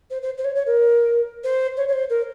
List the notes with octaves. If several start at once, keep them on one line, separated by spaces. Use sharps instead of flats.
C5
C5
C5
C#5
C#5
A#4
C5
C#5
C#5
C5
A#4